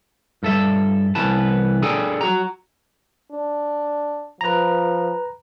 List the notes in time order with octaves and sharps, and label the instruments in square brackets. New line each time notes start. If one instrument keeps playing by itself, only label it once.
[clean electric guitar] G2 A4 E5
C2 E3 B3 B4 A5
D4 G#4 A4 G5 G#5
F#4 A#5
[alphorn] D4
[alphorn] F3 [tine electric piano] B4 A#5